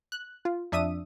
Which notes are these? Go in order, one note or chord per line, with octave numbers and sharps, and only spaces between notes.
F#6
F4
F2 D4 E5 D#6 D#7